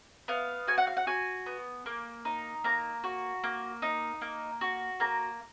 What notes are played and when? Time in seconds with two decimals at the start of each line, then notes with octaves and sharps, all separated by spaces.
0.28 B3 F5
0.68 F#4 G#5
0.78 F#5
0.87 F5
0.97 F#5
1.07 F#4 G#5
1.46 B3
1.86 A#3
2.25 D#4
2.64 A#3 A#5
3.04 F#4
3.44 A#3
3.82 D#4
4.21 A#3
4.61 F#4
5.00 A#3 A#5